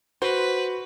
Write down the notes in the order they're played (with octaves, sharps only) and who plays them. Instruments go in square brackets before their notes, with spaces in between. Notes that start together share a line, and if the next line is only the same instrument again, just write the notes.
[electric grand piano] F#4 [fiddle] B4 [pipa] C5